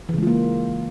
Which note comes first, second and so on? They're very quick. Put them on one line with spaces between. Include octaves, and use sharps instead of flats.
E3 C#3 G#3 F4 A#3